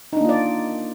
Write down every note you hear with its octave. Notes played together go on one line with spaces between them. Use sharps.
A#3 D4 D#4 F4 D5